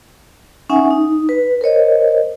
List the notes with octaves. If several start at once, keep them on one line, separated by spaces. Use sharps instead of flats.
C#4 D#4 E5 F#5 G#5
D#4
B4
A#4 C5 C#5 D#5